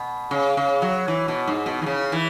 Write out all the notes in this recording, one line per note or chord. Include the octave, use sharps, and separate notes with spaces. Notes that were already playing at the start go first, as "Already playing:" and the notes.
Already playing: B2
C#3
C#3
F#3
E3
B2
G#2
B2
E3
C#3
E3